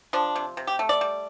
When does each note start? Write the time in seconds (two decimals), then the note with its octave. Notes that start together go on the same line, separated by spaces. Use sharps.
0.13 F3 D4
0.36 C3
0.57 C3
0.67 G4
0.79 A3
0.89 D5
1.01 G3